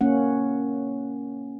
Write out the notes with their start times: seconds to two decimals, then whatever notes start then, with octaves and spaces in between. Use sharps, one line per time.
0.01 A#3 C#4 F#5